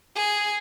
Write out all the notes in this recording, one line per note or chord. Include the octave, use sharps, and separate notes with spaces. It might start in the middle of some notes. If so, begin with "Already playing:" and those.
G#4